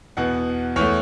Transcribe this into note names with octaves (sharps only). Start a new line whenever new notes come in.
E2 B2 B3 F#5
E2 E3 A3 C#5